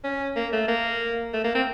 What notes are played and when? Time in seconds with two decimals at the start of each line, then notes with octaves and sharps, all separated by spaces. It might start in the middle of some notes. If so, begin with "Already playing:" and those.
0.04 C#4
0.36 A#3
0.53 A3
0.68 A#3
1.34 A3
1.44 A#3
1.55 C4